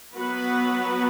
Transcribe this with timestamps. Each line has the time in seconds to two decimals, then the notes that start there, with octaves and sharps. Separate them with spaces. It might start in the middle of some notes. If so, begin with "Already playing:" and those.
0.17 F#3 B3 F#4 B4